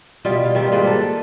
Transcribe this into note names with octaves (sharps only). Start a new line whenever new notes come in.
B2 G3 E4 F4
F5
D#3 G3 C4
G#2 A#3 F4 B4
A4